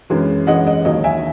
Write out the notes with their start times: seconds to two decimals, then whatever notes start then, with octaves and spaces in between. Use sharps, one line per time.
0.10 F#2 E3 G#3
0.47 F#2 E3 G#3 D#5 F#5
0.67 D#5
0.85 D#2 D#3 F#3 D#5
1.04 E5 G#5